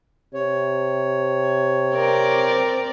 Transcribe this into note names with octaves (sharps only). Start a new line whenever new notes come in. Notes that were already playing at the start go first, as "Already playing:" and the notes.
C3 C#5
C4 A#4 D5